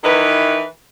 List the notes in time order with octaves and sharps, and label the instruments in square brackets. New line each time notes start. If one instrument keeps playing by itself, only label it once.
[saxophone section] D#3 E3 D#4 E4 B4